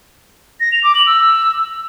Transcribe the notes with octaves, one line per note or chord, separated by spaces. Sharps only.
A#6
F7
D6
F#7
E6